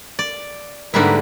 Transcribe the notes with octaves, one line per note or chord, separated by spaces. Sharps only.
D5
G#2 D3 G3 A#3 E4 A#4 B4 E5